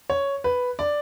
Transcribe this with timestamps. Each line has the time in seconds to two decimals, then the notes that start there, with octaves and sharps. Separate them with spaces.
0.10 C#5
0.44 B4
0.79 D5